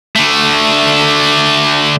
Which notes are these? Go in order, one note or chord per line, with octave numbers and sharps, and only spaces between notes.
D3 A3